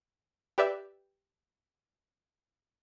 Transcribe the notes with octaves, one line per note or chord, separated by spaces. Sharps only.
G4 B4 D5 E5